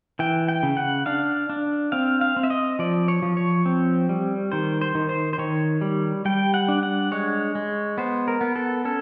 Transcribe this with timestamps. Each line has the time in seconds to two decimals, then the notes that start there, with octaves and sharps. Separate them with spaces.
0.19 E3 G5
0.48 G5
0.63 C#3
0.77 F#5
1.06 D4 F5
1.50 D4
1.92 C4 F5
2.21 F5
2.36 C4
2.43 E5
2.50 D#5
2.79 F3 D5
3.08 C#5
3.22 F3
3.37 C#5
3.66 C4
4.09 G3
4.52 D#3 C5
4.81 C5
4.95 D#3
5.09 C5
5.33 C5
5.38 D#3 C#5
5.81 G3
6.25 G3 G5
6.54 F#5
6.68 D4
6.83 F#5
7.12 G#3 C#5
7.55 G#3
7.98 B3 C5
8.28 A#4
8.41 B3
8.56 A4
8.85 C#4 A4